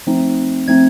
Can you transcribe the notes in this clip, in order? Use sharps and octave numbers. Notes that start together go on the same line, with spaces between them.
F3 A3 C4 D#4
F3 A3 C4 D#4 G#6